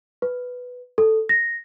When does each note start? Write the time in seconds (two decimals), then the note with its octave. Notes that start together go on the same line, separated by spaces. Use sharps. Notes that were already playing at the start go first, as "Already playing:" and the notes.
0.22 B4
0.98 A4
1.29 A#6